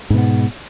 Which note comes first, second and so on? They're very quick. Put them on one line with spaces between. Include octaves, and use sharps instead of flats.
G#2 B2 B3